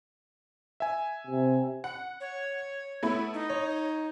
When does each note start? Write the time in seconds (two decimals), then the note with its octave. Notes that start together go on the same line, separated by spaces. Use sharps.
0.80 E5 G#5
1.27 C3
1.84 F#5
2.21 C#5
3.03 A3 B3 E4
3.34 D#4
3.50 C#5